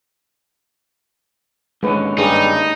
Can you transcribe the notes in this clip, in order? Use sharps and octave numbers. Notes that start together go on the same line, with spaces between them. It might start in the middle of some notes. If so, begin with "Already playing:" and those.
D#2 D3 G#3 C#4 B4
G2 D#4 G#4